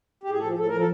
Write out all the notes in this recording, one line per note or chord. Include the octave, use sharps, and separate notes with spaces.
G4
A2 G#4
A4
F3
A2 A4
A#4
F3 A4